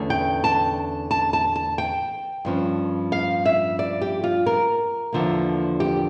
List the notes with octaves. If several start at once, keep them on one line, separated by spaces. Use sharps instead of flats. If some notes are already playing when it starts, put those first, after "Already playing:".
Already playing: E2 D3 A3 C#4
G5
A5
A5
A5
A5
G5
G2 F3 C#4
F5
E5
D5
G4
F4
A#4
E2 D3 F3 A#3
G4